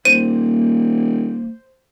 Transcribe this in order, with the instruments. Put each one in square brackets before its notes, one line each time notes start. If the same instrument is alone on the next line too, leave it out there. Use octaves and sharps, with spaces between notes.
[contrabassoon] D#1 [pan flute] A#3 [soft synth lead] C5 [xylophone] D#7